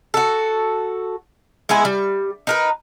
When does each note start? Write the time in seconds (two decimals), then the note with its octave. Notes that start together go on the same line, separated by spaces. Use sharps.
0.14 F#4 A4
1.69 G#3 B3 E4 G#5
1.85 G3
2.47 D#4 A#4 B4